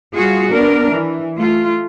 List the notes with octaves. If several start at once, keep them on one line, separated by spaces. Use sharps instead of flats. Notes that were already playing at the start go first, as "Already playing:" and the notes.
G3 F4 F#4 G#4
B3 D4 A#4
E3
A3 F4